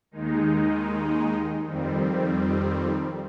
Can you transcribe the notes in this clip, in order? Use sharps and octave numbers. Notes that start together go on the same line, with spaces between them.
D#2 D#3 G#3 D#4
F2 D#3 G3 C4